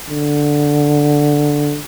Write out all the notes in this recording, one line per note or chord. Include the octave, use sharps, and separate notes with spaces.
D3